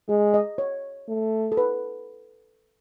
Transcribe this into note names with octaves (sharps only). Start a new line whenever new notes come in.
G#3 G#4
D#5
C#5
A3
A4
B4